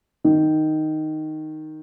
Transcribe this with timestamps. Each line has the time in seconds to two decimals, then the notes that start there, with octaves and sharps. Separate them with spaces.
0.24 D#3